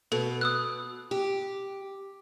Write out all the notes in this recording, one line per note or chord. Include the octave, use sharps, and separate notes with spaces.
B2 A4
D#6 E6 F#6
G4